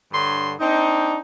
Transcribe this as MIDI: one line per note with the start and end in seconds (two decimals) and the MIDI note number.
0.13 0.55 43
0.13 0.55 50
0.13 0.55 73
0.13 0.55 84
0.60 1.19 60
0.60 1.19 62
0.60 1.19 63